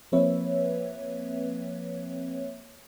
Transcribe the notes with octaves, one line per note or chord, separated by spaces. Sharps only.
F3 A#3 C4 B4 C#5 E5